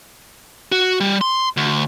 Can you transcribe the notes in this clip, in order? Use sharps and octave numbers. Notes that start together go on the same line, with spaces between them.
F#4
G3
C6
D2